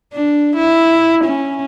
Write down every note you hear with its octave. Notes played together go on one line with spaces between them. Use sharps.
D4
E4
C#4